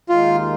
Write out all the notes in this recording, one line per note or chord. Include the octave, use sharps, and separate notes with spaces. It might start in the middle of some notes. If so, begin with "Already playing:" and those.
D#2 D#3 G#3 D#4 F4